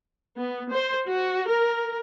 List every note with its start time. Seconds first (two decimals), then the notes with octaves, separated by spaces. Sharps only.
0.36 B3
0.71 C5
1.07 F#4
1.47 A#4